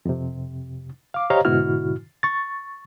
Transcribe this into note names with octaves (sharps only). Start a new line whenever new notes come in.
F2 C3
F5 D6
G4 C5 C#5 D#5 F5 A#5
G#2 B2 D3 E4 F#4 F6
C#6 A6